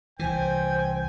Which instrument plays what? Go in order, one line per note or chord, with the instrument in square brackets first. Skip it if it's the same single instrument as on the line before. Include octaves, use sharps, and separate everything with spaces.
[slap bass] C2 E3 [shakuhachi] C5 [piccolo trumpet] G5 [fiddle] G#5